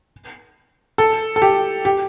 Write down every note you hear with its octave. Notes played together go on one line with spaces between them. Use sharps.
A4
A4
G4
G4